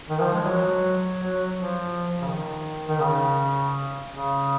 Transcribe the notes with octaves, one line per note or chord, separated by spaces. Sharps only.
D#3
F3
G#3
F#3
F#3
F3
C#3
D#3
D#3
C#3
C#3